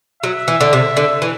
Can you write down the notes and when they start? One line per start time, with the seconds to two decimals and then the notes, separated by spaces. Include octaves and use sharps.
0.23 F#3 E5
0.48 E3
0.60 D3
0.73 C3
0.97 D3
1.22 E3